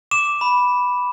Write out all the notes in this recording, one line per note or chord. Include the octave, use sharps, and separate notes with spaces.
D6 E7
B5